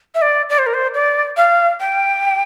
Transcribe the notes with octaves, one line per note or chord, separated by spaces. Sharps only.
E5
D5
D5
C5
A#4
C5
D5
F5
G5